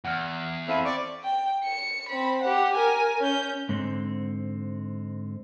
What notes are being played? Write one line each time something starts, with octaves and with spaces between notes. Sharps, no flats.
E2 F#5 F6
C4 E4 A4 E5 F5 D#7
D5 C#6 D6
G5
C#7
C4 B5
G4 F#5
A#4 G#5
C#4 G6
G#2 D3 C4